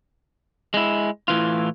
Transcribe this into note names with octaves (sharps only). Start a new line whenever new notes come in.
G#3 E4
A2 E3 F4